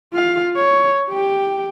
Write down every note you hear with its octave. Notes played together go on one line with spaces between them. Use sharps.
F4 F5
C#5
G4 G5